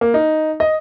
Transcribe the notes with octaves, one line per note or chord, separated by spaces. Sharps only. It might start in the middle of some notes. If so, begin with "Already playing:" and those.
A#3
D#4
D#5